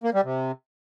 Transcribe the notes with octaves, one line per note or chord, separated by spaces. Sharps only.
A#3
G3
C3